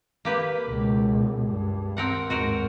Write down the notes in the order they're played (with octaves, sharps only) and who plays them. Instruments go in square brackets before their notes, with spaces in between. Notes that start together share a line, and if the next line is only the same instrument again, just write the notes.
[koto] A#3 G4 B4
[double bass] C#2 B2
G2
[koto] C4 A#4 F#5
[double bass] D#2 G#2 [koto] F#4 A#4 C5